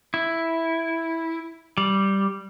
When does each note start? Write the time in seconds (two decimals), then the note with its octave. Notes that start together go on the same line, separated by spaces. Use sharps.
0.14 E4
1.78 G3